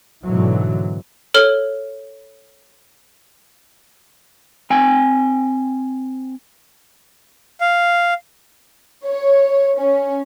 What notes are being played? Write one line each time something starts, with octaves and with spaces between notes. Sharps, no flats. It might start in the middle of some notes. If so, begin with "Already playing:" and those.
G#2 B2 D3 E3 F#3
A4 C#5 F6 G7
C4 G5 G#5
F5
C#5
C#4